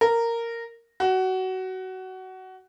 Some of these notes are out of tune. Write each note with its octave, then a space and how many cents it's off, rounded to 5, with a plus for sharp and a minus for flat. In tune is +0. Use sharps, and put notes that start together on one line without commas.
A#4 -10
F#4 +20